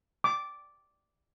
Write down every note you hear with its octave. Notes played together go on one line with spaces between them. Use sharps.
D6